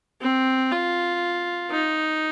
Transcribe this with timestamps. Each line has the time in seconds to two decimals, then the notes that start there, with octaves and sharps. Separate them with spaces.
0.22 C4
0.71 F4
1.71 D#4